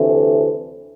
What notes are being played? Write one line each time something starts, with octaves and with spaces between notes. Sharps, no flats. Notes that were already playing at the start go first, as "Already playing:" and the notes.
Already playing: D2 C3 E3 A3